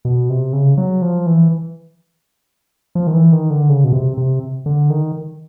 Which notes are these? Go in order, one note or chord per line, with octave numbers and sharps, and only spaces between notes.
B2
C3
C#3
F#3
F3
E3
F3
D#3
E3
D#3
D3
C#3
B2
C3
C3
D3
D#3